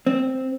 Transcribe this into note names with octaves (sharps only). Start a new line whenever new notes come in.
C4